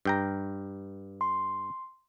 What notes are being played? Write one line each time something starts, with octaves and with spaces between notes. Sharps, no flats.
G2 G5 A#5
C6